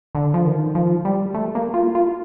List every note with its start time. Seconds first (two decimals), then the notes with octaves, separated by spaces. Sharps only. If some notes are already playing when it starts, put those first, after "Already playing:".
0.15 D3
0.34 F3
0.46 D#3
0.75 F3
1.05 G3
1.34 A3
1.55 A#3
1.74 F4
1.95 F4